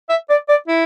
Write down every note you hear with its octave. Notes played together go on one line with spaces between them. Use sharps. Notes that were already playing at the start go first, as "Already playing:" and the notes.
E5
D5
D5
E4